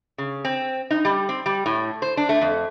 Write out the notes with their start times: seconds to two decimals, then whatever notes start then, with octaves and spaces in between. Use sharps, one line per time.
0.18 C#3
0.45 C4
0.91 D#4
1.05 G3
1.29 C4
1.46 G3
1.66 A2
2.02 C5
2.17 D4
2.29 A3
2.41 F2